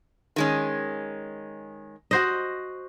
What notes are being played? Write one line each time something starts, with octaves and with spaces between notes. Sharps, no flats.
D#3 G#3 C#4
F#4 C5 D#5